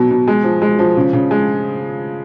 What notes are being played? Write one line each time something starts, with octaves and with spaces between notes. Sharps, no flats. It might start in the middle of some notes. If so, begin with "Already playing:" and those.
Already playing: B2 F#3
B2
G#3
F3
G#3
F3
C#3
C#3
G#3